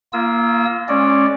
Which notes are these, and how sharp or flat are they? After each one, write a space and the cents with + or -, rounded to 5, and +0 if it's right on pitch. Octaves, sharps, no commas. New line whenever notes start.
A#3 +10 F4 -35 E6 -35
G#3 +10 C#4 -15 D5 +0